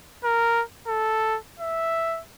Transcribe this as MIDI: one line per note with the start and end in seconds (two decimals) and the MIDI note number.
0.24 0.63 70
0.88 1.38 69
1.60 2.21 76